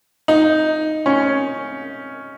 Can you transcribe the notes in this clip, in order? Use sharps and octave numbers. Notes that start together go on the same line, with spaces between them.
D#4
C#4